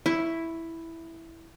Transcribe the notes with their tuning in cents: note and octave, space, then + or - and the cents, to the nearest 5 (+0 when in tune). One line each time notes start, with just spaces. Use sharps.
E4 +0 C#6 +0